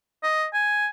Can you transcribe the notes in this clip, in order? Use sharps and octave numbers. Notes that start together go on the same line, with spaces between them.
D#5
G#5